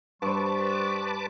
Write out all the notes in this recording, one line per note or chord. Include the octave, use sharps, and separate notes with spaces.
G2 G3 B4 C5 A5 C#6 D6